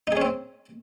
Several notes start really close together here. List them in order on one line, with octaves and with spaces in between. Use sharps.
D#4 G#4 C#4 C4